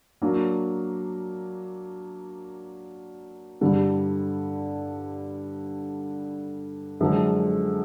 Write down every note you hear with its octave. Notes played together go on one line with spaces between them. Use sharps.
F#3 A#3 D4
G2 D3 G3
F#2 D3 F3 G#3